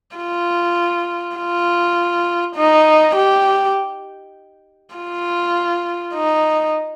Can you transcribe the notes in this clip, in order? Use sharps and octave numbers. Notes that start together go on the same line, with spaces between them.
F4
F4
D#4
G4
F4
D#4